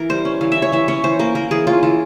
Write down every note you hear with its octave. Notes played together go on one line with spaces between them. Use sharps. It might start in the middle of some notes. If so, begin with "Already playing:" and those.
Already playing: E3 A#4
G3 C5
C#4
E3 F5
E3 E5
C#5
E3 E5
C#4 C#5
E3 C5
A#3 A#4
A#3 A#4
E3 G#4
C#4 F4
E3 F4